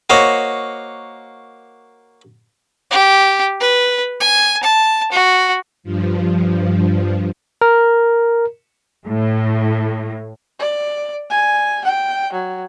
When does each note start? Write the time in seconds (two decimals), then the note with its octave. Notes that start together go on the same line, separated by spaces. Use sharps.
0.10 A#3 F#4 C5 C#5 D#5
2.91 G4
3.60 B4
4.20 G#5
4.63 A5
5.12 F#4
5.84 G2 F3
7.61 A#4
9.06 A2
10.60 D5
11.30 G#5
11.84 G5
12.33 F#3